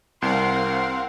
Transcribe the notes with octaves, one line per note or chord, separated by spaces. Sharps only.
C2 C4 A#4 F5 F#5 C6